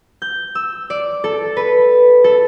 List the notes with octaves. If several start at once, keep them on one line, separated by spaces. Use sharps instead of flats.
G6
E6
D5
A4
B4
A4